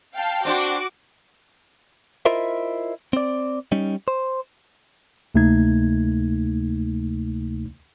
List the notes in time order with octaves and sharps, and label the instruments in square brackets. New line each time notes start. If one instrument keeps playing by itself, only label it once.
[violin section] F5 G5 A5
[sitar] C4 D4 C5 [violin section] F#4 D6
[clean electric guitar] E4 F4 A#4 C5 D#5 E5
C4 D5
G3 C#4 D#4
C5
[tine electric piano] D2 C3 A3 A#3 D#4 G#6